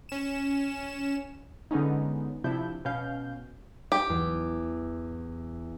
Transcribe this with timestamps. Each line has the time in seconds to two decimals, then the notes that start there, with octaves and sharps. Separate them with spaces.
0.09 C#4 E7
1.71 D3 G#3 B3 C#4 D#4
2.44 C3 F3 D4 E4 E5 G6
2.85 B2 C#4 F5 G6
3.92 G4
4.09 E2